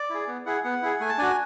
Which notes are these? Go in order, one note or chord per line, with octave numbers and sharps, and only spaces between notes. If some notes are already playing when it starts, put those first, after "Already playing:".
Already playing: D5
E4 G#4
B3
E4 G#4 F#5
B3 F#5
E4 G#4
A3 G#5
A5
D4 F#4 G#5